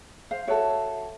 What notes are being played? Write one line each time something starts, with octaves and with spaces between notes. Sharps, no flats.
C5 F5
F#4 A4 C#5 E5